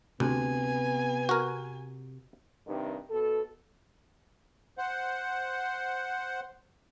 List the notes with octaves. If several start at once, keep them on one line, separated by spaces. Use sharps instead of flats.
D2 C3 B3 G#5
F#4 A#4
G2 C3 D#3
B2 A4
C5 F#5